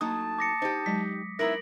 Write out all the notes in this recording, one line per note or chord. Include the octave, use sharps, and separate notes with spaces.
F#3 A3 A#3 D4 D#4 A5 D#6
D6 A#6 C#7
D#4 G4 C5
F#3 G#3 B6
B3 D#4 E4 A#4 E5 A#6 D7 F#7